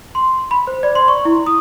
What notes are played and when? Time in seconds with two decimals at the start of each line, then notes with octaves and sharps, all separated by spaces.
0.15 C6
0.51 B5
0.67 C5
0.83 D5
0.95 C6
1.08 C#6
1.25 E4
1.46 D#6